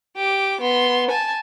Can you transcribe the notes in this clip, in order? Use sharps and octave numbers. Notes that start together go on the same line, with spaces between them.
G4 D6
B3 C6
G#5 A5